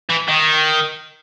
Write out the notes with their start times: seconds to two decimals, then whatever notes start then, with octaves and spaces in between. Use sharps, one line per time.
0.09 E3
0.28 D#3